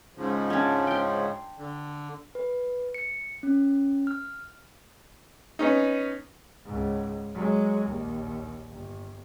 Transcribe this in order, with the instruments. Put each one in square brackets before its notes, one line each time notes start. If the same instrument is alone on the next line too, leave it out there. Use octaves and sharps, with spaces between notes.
[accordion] G#2 C#3 F3
[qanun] C#4 D4
G5 C6
[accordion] D3
[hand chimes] B4
C#7
C#4
F6
[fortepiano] B3 C#4 D#4
[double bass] C#2 G#2
F#3 G#3
A#1 D#2
G1